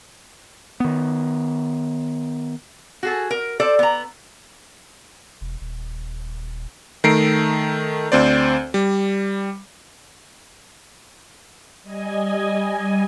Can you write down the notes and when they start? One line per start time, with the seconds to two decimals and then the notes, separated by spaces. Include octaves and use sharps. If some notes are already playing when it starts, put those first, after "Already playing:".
0.80 D#3 B3
3.03 F#4 G#4 A4
3.31 A#4
3.60 A4 C5 D5
3.79 B3 A#5
5.41 E1
5.61 D#1
7.04 D#3 A3 A#5 C7 D7
8.12 D2 C4 C5 D5
8.74 G3
11.83 G3 D#5 G#5